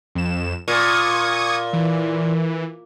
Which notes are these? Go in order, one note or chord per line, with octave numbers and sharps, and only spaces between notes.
F2 E7
A#2 C#6 D#6 G#6
E3